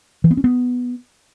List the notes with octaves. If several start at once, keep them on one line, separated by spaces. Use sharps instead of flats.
E3
B3
C#4
B3